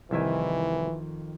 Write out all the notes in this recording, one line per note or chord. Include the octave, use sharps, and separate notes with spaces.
C2 F2 D#3 E3 E5 G#5